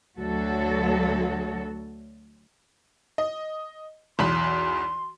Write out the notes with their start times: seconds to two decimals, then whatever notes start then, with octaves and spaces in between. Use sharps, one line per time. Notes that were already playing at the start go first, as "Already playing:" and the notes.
0.18 D2 F#3 F#4 A4
3.18 D#5
4.19 B1 E2 B5 C6